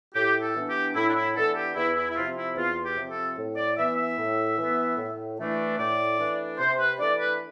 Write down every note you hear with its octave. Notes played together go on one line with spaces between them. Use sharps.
A2 G4
A4
E3 B3 D4
G4
A2 E4
D4
E4
E3 B3 D4 A4
G4
E2 E4
E4
E4
C3 F3 C4 F4
E4
E2 F4
G4
C3 F3 C4
A4
A2
D5
E3 B3 E5
E5
A2
E3 B3
A2
E3 A3 D4
A2 D5
E3 A3 D4
C3 C5
B4
E3 A3 D4 D5
B4